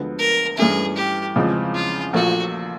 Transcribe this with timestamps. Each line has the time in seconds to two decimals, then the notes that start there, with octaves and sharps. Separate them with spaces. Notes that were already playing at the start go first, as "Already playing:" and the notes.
Already playing: D2 D3 F3 G#3 B3
0.19 A#4
0.58 G2 E3 A3 C#4 E4 G#4
0.96 G4
1.36 E2 C#3 F3 G#3 C4
1.74 F4
2.13 A#1 A#2 F3 A3 F#4